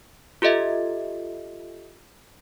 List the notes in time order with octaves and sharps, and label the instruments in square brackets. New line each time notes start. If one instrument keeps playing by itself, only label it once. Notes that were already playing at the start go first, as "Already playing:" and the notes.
[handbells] F4 G4 A4 D#5 E5